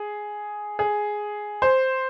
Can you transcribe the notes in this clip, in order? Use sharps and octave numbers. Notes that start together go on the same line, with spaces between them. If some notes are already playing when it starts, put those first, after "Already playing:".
Already playing: G#4
G#4
C5